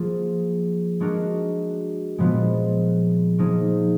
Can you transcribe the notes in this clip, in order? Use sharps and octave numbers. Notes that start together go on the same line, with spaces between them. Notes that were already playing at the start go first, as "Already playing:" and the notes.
Already playing: F3 A#3 F4 G#4
G#3 D4 F#4 A#4
A#2 F3 G#3 B3 F4
F3 A#3 D#4 G#4